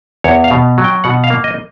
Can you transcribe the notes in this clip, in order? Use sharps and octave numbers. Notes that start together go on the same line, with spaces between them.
E2 C#5
F5
B2
F#3
G5
B2 F#5
F5
A#3
D#5